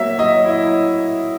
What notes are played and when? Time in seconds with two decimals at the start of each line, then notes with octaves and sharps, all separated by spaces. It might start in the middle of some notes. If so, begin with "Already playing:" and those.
Already playing: F#3 A#3 E5
0.18 F#3 D#5
0.45 E4